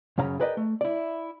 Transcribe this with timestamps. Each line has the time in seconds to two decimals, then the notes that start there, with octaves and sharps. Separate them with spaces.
0.18 F#2 C#3 C#5 F5 A#5 B5
0.40 G#4 A#4 B4 D5 D#5 G5
0.57 A3
0.81 E4 D5